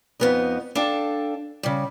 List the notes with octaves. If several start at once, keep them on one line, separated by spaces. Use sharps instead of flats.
F2 B3 D#4
D4 A4 F5 G5
C#3 G3